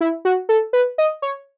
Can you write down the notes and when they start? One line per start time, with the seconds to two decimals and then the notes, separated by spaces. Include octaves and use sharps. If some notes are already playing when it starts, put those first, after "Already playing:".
0.01 E4
0.25 F#4
0.49 A4
0.73 B4
0.98 D#5
1.22 C#5